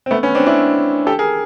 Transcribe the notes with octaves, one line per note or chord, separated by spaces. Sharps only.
C4
A3 B3
B3 C#4
C4 D4
D4 E4
G4 A4
G#4 A#4